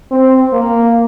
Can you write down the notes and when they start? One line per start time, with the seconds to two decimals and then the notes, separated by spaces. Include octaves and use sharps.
0.11 C4
0.53 A#3